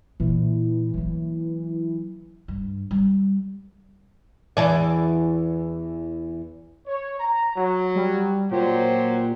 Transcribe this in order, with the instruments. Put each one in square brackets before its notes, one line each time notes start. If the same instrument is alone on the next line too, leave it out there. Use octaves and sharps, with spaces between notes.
[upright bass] A#2 [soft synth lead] E3
[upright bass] F#3 A#3
G2
G3
[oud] E2 E3 D5
[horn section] C#5
A#5
F#3
[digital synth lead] G3
[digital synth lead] A#2 [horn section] F#3 G4 C5